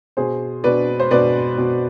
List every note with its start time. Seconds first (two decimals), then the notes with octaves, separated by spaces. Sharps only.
0.17 B2 G#4 C5
0.64 B2 B4 D5
1.00 C5
1.11 B2 B4 D5
1.58 B2